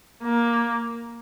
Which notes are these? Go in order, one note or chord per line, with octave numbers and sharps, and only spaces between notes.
A#3